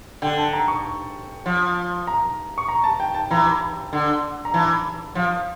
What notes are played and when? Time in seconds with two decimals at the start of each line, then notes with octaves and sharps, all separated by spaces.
0.22 D3 G5
0.38 A5
0.53 A#5
0.68 C#6
1.46 F3
2.07 A#5
2.58 C#6
2.68 A#5
2.84 A5
3.00 G5
3.15 A5
3.31 E3 A#5
3.93 D3
4.45 A#5
4.54 E3 A5
5.15 F3 F5